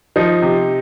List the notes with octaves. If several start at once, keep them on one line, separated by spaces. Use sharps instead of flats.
F3 D#4
C3